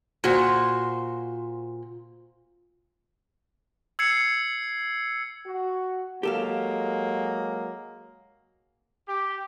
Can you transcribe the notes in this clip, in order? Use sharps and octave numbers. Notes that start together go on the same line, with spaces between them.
A#2 F#4 C5
E6 G#6 C7 C#7
F#4
F#3 G#3 A#3 G4 A4 F5
G4